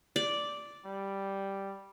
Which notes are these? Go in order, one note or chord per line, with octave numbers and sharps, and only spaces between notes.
D5
G3